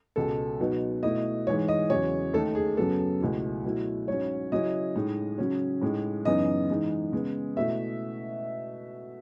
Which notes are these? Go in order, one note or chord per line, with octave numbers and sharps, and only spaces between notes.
C#2 B2 G#3 A4
B2 F#3 B3 D#4
B2 A3 E4 D#5
G#2 E3 G#3 C#5
D#5
E2 C#3 F#3 C#5
D#2 D#3 A3 D#4 A4
G#4
F#2 C#3 F#3 B3 A4
C#2 B2 A3 E4
B2 F#3 A3 E4
G#2 F#3 C#4 C#5
C#3 F#3 C#4 E4 D#5
A2 G#3 D#4
C#3 F#3 C#4
A2 G#3 D#4
F#2 C#3 E3 B3 D#4 D#5
G#2 E3 G#3 D#4
C#3 G#3 B3
B2 A3 E4 E5